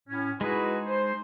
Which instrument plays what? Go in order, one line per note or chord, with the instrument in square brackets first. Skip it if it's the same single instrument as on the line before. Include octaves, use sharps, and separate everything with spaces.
[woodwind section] A2 C#4
[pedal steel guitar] G#3 D#4 G#4 [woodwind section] E4 F#4 B4
[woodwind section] C5